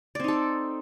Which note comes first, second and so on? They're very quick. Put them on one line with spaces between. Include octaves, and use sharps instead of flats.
D5 C4 D#4 A4